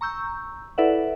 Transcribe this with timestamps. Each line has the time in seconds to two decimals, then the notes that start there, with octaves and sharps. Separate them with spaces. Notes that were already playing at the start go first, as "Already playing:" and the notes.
0.01 A#5 C#6 E6 G6
0.78 E4 A4 B4 D5 E5 F#5